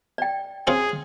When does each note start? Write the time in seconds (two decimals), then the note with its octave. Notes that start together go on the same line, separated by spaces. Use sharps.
0.18 D5 G5
0.67 C4 C#4 F4 G#4